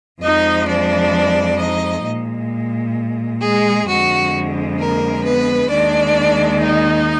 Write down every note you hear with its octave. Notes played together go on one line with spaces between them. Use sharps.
F2 F3 G#3 D#4 D#5
D4 D5
D#4 D#5
A#2 G#3
G#3 G#4
F2 D3 G#3 F#4
A#3 A#4
B3 B4
D#2 D#3 G#3 D4 D5
D#4 D#5